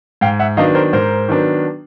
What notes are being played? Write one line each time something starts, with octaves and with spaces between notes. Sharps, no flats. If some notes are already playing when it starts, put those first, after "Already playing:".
G#2 F5 G5
E5 F#5
D#3 F#3 B3 D4 D#5 F5
A#4 C5
G#2 A#4 C5
D#3 F#3 B3 D4